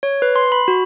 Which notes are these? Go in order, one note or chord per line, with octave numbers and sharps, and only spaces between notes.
C#5
B4
C6
B5
F#4